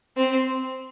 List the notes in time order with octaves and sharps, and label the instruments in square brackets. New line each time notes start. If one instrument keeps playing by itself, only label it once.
[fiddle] C4